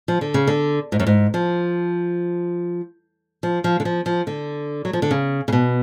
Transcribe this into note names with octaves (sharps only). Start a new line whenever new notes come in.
F3
D3
C#3
D3
G#2
F#2
G#2
F3
F3
F3
D3
F3
F3
D3
F#3
F3
D3
C#3
C#3
B2